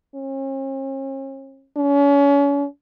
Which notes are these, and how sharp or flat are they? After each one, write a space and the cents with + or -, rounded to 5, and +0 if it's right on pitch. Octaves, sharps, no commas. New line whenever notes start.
C#4 -45
C#4 +35